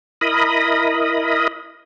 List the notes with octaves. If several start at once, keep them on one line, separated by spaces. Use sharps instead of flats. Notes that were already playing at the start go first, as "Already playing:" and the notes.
E4 A#4 D#5 B5 D#6